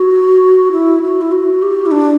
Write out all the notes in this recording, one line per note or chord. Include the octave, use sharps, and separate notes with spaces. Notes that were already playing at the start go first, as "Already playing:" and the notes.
Already playing: F#4
E4
F#4
E4
F#4
G4
E4
D4